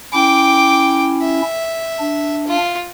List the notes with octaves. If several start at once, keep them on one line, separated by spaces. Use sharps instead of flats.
C#4 E4 G5 D6
E5
D4
F4